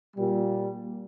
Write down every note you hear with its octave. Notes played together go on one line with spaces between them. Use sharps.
A#2 G3